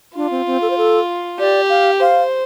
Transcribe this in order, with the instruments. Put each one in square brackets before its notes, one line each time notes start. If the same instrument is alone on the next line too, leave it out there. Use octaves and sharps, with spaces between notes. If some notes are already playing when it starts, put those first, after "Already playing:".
[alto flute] D4 [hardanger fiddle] F4
[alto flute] C4
C4
A4
C5
A4
[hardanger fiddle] G4 [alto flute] D5
[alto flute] F5
[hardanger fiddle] C5 [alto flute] F5